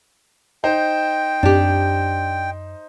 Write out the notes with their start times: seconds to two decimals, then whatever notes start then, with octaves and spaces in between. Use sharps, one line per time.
0.64 D#4 C5 G5
1.43 F#2 C4 D4 G4